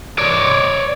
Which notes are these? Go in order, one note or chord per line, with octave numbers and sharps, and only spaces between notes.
C#5 D5